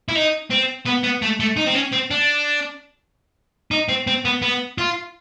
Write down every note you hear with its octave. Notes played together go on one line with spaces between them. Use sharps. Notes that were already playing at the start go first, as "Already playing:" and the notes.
E4
D#4
C4
B3
B3
A3
A3
D#4
C4
C#4
C4
D4
D#4
C4
C4
B3
B3
F4